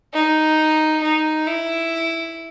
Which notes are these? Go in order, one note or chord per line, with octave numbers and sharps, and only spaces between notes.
D#4
D#4
E4